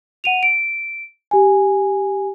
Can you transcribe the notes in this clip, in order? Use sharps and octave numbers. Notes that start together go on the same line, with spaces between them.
F#5 D#7 F7
D7
G4 G#5